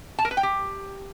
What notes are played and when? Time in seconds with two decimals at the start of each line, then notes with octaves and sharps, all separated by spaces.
0.19 A5
0.25 A#4
0.31 B4
0.37 G5
0.43 G4